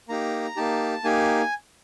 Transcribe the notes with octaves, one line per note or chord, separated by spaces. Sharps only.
A#3 D#4 G4 A#5
A#3 D#4 G4 A5
A#3 D#4 G4 G#5